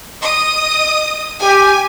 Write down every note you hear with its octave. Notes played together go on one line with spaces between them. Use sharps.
D#5 D#6
G4 G#5